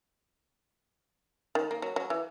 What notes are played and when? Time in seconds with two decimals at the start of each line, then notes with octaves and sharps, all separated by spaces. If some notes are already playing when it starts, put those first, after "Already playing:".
1.55 D#3
1.71 A#3
1.82 F#3
1.96 F#3
2.10 E3